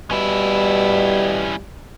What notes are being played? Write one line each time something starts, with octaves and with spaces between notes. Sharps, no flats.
B2 G3 C#4 E4